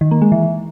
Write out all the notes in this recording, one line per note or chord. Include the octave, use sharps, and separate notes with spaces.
D#3
A#3
G#3
E3